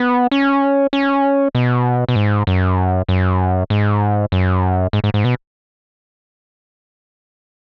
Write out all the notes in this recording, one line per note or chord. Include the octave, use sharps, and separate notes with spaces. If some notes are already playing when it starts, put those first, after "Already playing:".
Already playing: B3
C#4
C#4
B2
B2
G#2
F#2
F#2
G#2
F#2
G#2
G#2
G#2
B2